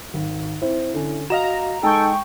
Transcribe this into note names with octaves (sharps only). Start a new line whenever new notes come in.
G#1
C4 E4
D3 C#4
F#4 D#5 F5 A#5 E7
G#3 D#4 A4 G5 C#6